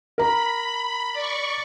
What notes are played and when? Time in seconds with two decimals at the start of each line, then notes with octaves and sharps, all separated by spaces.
0.18 A#4 A#5 B5
1.13 D5 C#6